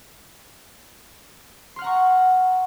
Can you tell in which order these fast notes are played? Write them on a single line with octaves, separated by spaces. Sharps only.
C6 F6 F#5 A#5 C#6